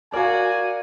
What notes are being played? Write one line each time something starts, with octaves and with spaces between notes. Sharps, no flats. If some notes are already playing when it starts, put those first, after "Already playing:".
F#4 A#4 D5 F5 G#5